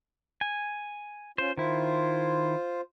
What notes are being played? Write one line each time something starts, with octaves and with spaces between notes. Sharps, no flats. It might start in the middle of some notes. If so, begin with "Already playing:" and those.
G#5
C#4 F4 C5
D#3 E4 F4 C5